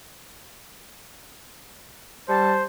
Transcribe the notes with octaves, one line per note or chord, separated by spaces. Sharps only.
G3 C5 A5